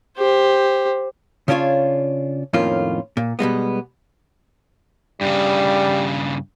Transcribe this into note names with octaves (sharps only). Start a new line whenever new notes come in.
G4 C5
C#3 C#4 D4 F4 C#5
F2 A2 D#3 A#3 C#4 F4
A#2
B2 G3 G#3 B3
G2 C#3 G3